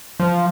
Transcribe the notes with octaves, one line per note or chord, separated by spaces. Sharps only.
F3